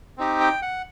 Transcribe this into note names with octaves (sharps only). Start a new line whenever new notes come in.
C4 D#4 G4
G5
F#5